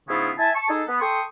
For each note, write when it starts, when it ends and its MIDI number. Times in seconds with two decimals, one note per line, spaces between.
0.09 0.31 44
0.09 0.31 49
0.09 0.31 59
0.09 0.31 61
0.09 0.31 64
0.09 0.31 65
0.38 0.50 64
0.38 0.50 76
0.38 0.50 80
0.38 0.50 81
0.55 0.66 81
0.55 0.66 85
0.69 0.82 63
0.69 0.82 68
0.69 0.82 69
0.88 0.97 59
1.01 1.22 69
1.01 1.22 79
1.01 1.22 84
1.01 1.22 85
1.01 1.22 87